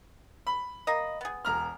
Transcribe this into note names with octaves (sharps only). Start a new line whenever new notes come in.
B5
A#3 D#5
B3 G#4
E1 A#5 F6